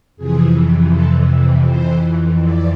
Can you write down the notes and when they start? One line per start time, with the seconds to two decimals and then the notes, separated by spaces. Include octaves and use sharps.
0.17 F2 C3 E3 G#4
0.91 A4
1.66 F2 E3 C5
2.42 D5